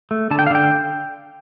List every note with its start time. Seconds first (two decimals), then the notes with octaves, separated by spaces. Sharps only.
0.11 A3
0.31 D3 A5
0.39 G5
0.47 F5
0.51 D3 G5